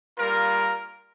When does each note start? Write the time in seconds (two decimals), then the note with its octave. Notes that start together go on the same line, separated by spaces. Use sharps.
0.18 G3 A#3 F4 A#4